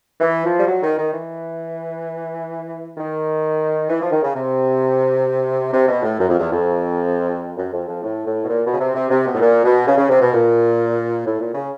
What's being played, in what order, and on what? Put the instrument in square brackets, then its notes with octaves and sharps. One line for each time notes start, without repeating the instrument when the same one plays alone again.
[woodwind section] E3
F3
G3
F#3
D#3
D#3
E3
D#3
E3
F3
D#3
C#3
C3
C3
B2
A2
F#2
F2
E2
F2
F#2
F2
F2
A2
A2
B2
A#2
B2
C#3
C3
C3
C3
B2
A2
A#2
B2
C#3
C#3
C3
B2
A#2
A2
A#2
C#3